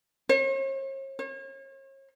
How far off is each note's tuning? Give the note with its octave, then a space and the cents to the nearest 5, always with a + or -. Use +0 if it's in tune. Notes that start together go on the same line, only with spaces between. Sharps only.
C#5 -45
C#5 -40